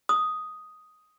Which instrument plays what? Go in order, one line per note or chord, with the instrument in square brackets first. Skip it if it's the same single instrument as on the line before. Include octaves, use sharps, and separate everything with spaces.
[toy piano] D#6